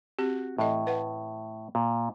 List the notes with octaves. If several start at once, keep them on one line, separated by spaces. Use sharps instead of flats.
C4 F#4 G4
A2 E3 A4 D#5
A3 B4 F#5
A#2